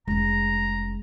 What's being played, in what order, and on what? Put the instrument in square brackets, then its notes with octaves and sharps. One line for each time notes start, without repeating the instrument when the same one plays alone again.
[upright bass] F1 C#4 [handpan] G#3 [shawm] A#5